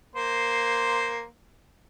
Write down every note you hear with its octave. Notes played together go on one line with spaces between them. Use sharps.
A#3 C5